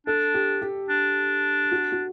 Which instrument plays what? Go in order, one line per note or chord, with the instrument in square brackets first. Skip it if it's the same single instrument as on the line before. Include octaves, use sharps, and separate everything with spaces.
[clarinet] D4 [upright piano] A4
[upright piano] G4
G4
[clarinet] D4
[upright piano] F#4
F#4